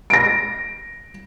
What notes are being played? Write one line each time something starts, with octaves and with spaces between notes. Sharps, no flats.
A#6 D7